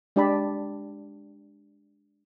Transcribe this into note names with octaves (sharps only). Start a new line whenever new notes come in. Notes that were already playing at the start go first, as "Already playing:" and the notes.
G#3 D4 G4 D5 A5 B5